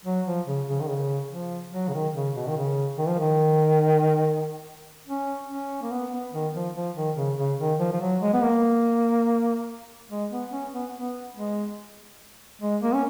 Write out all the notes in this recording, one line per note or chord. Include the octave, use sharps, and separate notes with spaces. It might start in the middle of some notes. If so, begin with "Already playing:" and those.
F#3
F3
C#3
C#3
D#3
C#3
F3
F#3
C#3
D#3
C#3
B2
D#3
C#3
D#3
F3
D#3
C#4
C#4
A#3
B3
B3
D#3
F3
F3
D#3
C#3
C#3
D#3
F3
F3
F#3
G#3
B3
A#3
G#3
B3
C#4
B3
B3
G#3
G#3
A#3
C#4